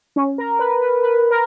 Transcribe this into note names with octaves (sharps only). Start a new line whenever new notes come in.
C#4
A#4
B4
B4
B4
A#4